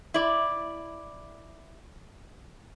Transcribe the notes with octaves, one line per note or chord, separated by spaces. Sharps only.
E4 D5